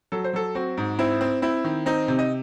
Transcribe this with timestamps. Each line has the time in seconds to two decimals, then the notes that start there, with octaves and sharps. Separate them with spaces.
0.12 F#3 A4
0.24 C5
0.33 F#3 A4
0.55 C4 F#4
0.77 G#2
0.99 C4 E4
1.21 C4
1.42 C4 E4
1.64 D#3
1.86 C4 D#4
2.08 C3
2.19 D#5